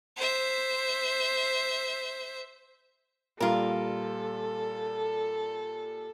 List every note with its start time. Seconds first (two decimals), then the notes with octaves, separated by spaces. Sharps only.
0.17 C5 E5
3.40 A#2 G3 F4 A4 A#4